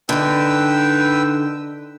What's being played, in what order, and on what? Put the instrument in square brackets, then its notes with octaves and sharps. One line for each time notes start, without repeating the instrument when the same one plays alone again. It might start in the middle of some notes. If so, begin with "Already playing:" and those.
[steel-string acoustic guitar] D3 D#4 [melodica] B4 G5 E6